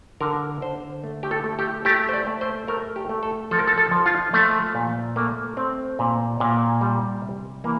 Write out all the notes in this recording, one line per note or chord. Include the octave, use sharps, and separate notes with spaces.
D3 A#4
D3 C5
A3
G4
A4
A3
G4
A3 G4
C5
D5
A3
C5
A3 A#4
G4
A3
A4
F3 A4
A#4
A4
A4
F3
F4
F3 A3
A#2
A3 A#3
A3 C4
A#2
A#2
G3
C3
E3 A#3